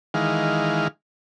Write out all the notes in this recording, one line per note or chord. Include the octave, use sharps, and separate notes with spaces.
D#3 E3 G#3 F5